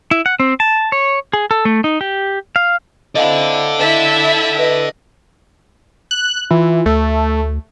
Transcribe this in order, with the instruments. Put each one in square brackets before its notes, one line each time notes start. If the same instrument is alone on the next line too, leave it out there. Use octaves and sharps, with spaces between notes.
[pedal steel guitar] E4
F#5
C4
A5
C#5
G#4
A4
A3
D#4
G4
F5
[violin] C4 E4 [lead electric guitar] A4 D5 [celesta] D#5 F5 F#7
[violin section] E4 E5 [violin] A5
[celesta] B4 [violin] D#5
[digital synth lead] F#6
[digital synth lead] E3 [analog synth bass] F4
[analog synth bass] D2 [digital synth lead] A3